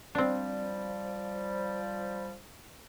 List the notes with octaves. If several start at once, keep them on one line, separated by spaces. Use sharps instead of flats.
F3 G3 C4 D4